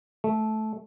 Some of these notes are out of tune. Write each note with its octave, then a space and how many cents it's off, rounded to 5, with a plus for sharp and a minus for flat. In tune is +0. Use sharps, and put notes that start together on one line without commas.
A3 -15